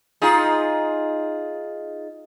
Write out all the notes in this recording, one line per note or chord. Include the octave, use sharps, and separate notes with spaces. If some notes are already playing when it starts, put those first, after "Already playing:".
D#4 F4 G#4